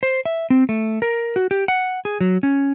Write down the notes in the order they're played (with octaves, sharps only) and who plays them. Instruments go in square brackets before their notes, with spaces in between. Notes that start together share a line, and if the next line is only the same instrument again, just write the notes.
[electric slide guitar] C5
E5
C4
A3
A#4
F#4
G4
F#5
G#4
F#3
C#4